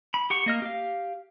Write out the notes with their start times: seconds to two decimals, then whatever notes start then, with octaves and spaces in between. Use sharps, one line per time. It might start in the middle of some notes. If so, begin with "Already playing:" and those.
0.14 B5
0.30 G4 F#5 C#6
0.46 A#3 D#5 F6
0.62 G4 F5